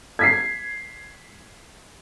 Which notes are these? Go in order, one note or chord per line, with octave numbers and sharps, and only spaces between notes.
G#6 B6 C7